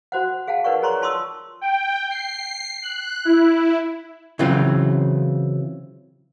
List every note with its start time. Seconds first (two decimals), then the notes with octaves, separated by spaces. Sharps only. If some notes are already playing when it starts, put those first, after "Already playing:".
0.12 F#4 C5 F#5
0.47 G#4 F5 F#5 A5
0.64 D#4 A#4 B4 D5 F#5 C#6
0.82 G#4 C#5 A#5 C6 C#6
1.02 F4 A5 C6 C#6 D#6 E6
1.61 G5
2.10 C7
2.83 F#6
3.25 E4
4.39 C#3 E3 F#3 C4 F4